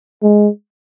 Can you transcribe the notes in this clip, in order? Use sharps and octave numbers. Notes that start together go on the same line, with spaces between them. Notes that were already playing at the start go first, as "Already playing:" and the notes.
G#3